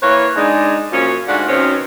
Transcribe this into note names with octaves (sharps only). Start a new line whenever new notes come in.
E3 A#3 B4 C#5
G#3 D4 D#4
F#2 A#2 F3 C#4
D2 G#2 D4 F4 F#4 F#5
B2 D#3 F3 C4 C#4